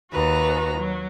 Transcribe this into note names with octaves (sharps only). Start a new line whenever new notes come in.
D#2 F#4 B4 A#5
F#3